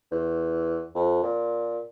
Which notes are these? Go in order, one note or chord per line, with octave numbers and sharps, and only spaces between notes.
E2
F2
A#2